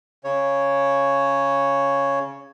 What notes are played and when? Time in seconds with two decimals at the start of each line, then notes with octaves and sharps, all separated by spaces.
0.24 C#3 C#5